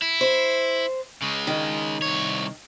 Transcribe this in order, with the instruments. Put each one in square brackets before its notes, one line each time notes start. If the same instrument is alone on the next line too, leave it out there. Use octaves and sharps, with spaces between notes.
[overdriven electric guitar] E4
[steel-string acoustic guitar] C5
[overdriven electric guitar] C#3 G#3
[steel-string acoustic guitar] D#3
[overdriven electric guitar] C2 C#5